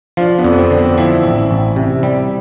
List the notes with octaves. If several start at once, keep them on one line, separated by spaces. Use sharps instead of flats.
F3 D4 F4
B3 D4
F2
B3
C4
D3 C4
B3 D4
F3 C4 E4
A1
A1
C3
G3